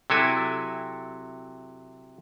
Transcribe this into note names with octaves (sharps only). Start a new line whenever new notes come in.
C3 F#3 E4 A4 G#5